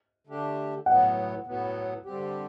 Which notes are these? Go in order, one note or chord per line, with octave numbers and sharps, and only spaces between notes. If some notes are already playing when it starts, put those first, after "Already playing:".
D3 A3 D4 G4
A2 F#3 B3 F#5
A2 F#3 B3
D3 G3 C4 G4